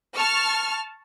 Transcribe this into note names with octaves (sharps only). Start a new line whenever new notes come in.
A5 C#6 F6